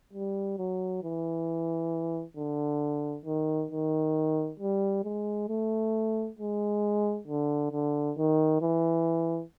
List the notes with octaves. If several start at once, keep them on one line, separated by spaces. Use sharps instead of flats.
G3
F#3
E3
D3
D#3
D#3
G3
G#3
A3
G#3
D3
D3
D#3
E3